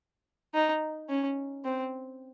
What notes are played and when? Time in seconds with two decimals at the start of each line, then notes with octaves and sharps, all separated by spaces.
0.54 D#4
1.09 C#4
1.64 C4